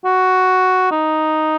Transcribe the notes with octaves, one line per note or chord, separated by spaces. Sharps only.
F#4
D#4